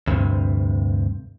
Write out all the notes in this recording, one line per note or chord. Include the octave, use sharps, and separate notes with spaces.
D2 G2 C3